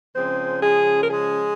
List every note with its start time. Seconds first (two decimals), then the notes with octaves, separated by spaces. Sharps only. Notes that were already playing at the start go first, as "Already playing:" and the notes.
0.15 C#3 F3 G#3 C4 C#4 C5
0.63 G#3 G#4
1.03 A#4
1.10 G#3 G#4